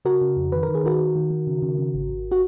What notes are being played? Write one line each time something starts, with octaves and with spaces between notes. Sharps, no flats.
C#3 F#4 A#4
C#3
F2
D#3 B4
A#4
D#3
G#4
D#3 F#4 A#4
D#3
D#3
D#3
C#3
C#3
C#3
G#1
G#1
F#4